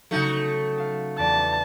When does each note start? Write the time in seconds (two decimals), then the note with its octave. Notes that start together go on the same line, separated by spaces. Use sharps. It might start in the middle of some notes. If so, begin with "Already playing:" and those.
0.11 C#3 F#3 A3 D#4 F#4
0.77 F5 A5
1.19 E2 B4 D5 A5